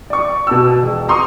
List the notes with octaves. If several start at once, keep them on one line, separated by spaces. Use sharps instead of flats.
D5 C#6
B2 A5 E6
E1
A#5 C6 C#6 D#6